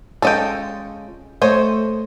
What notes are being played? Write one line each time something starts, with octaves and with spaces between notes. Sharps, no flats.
G#3 C#4 F4 A4 D#5 G5
A3 C5 C#5 D#5